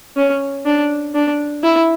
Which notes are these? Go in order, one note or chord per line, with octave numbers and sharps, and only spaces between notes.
C#4
D4
D4
E4